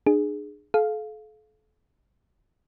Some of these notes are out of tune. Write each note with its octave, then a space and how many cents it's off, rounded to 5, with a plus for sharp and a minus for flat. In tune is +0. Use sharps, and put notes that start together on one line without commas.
D4 +35 G#4 +0
A4 -40 F5 +0